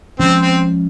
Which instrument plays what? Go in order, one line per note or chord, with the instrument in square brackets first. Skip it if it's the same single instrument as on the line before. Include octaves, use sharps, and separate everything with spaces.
[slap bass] F3 G#3 C#4 [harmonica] C4
[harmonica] C4